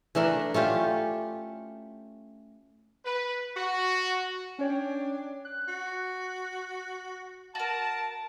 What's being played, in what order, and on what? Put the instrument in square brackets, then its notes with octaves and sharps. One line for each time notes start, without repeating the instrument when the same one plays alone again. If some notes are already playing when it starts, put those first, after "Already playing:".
[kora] E3 A3 D4 A#4
A3 C#4 F4 G4
[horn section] B4
F#4
[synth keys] C#4 C#5 G5 [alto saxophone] D4
[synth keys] F#6
[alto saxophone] F#4
[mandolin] F#4 A#4 [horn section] A5